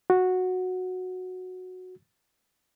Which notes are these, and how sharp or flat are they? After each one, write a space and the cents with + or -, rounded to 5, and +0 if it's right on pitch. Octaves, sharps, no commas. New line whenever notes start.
F#4 -10